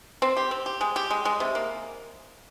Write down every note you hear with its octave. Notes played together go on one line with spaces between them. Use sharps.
C4
G4
C4
G4
G#3
G4
G#3
G#3
C3
A#3